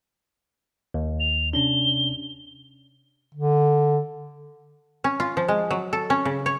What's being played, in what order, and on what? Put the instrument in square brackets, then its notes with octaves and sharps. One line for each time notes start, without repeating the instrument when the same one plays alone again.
[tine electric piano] D#2
[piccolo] F7
[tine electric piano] C3 C#4 D4 [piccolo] G7
[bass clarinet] D3
[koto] C#4
F4
F3
G#3
F#3
A4
C#4
C#3
C#5